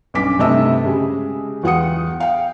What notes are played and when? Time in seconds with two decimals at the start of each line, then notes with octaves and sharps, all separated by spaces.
0.14 B1 G2 C#4 D6 B6
0.39 G2 C3 A3 D#5 A5 E6
0.84 C#3 G#3 G4 G#4
1.63 E2 F4 F#5 G5 D#6 C#7
2.20 F5 G5